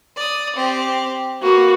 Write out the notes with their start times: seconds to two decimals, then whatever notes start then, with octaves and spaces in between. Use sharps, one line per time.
0.16 D5 D#6
0.56 C4 G4
1.42 A#3 F#4 B4